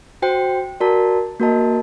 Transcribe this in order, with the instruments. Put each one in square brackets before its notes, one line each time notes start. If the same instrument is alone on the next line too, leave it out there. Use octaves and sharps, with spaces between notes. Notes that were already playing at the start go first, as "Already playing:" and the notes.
[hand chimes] F#4 C5 G5
F#4 A#4 D5 A5
A#3 F#4 A#4 D#5 A5